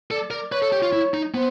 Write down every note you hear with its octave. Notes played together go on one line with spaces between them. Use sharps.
A4 D5
A#4 D5
B4 C#5
A4
G4
F4
E4
D#4
B3 C5